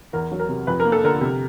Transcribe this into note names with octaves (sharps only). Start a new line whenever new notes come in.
E2 A#4
F#3
A#4
C3
F2 B4
A#4
A#3
A4
D3 A#4
C3